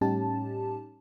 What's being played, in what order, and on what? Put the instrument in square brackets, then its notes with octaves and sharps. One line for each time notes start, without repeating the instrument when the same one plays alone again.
[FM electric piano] A2 G3 C#4 D#4 G4 A5